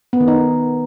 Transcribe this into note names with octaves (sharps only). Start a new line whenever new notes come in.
B3
D#3
D#4